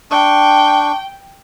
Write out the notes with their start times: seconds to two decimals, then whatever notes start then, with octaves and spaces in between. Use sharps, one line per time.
0.11 D4 G5 C#6